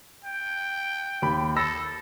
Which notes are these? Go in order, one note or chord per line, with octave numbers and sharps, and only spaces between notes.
G5
D#2 B5
A4 B5 E6 A#6